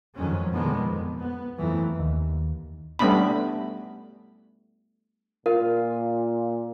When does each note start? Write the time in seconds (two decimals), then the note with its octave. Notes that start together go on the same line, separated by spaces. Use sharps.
0.15 F2 D#3 F#3 G#3 C#4
0.52 B2 D3 D#3 F3 G#3 B3
0.85 F2
1.18 B3
1.57 F2 E3 F#3 A3
1.99 D#2
2.99 G3 A3 B3 C#4 D4 B5
5.46 A#2 F4 A#4 F5